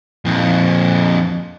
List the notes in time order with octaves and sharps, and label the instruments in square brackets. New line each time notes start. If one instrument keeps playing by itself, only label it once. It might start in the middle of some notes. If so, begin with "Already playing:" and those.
[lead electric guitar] F2 A#2